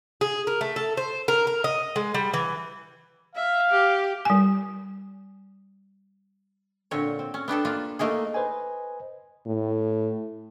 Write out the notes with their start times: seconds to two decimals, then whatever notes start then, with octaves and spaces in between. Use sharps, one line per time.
0.21 G#4
0.47 A#4
0.61 A3
0.76 A4
0.97 C5
1.28 A#4
1.47 A#4
1.64 D#5
1.96 G#3
2.14 G3
2.34 E3
3.36 E5 F5
3.70 G4
4.25 G3 G#5
6.91 A#2 D3 C4 C#5
7.19 C4
7.34 C#4
7.48 B3 D4 G4 A4
7.65 A#3 F4 B4
7.99 A3 A#3 D#4 G#4
8.34 B4 C5 D#5 G#5
9.46 A2